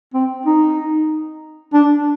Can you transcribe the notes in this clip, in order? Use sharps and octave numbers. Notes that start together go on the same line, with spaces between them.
C4
D#4
D4